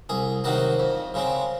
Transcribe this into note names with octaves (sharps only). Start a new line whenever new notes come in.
C2 G#4
C3 D#3 F#3 F#4
F2
C#3 G#3 C4